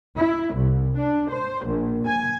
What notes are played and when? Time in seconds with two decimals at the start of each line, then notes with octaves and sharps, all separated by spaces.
0.16 E4
0.54 C2
0.96 D4
1.31 C5
1.65 A#1
2.07 G#5